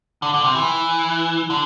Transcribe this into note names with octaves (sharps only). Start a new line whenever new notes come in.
D3
D3
C3
E3
D3